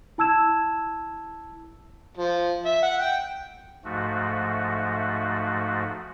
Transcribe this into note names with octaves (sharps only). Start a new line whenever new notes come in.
E4 A5 E6 G#6 E7
F3
E5
F#5
G5
G#2 F3 A3 F#4